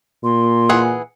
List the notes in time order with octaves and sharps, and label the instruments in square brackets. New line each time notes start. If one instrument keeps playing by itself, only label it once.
[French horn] A#2 [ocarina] C6
[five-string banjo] E3 G#4 F#5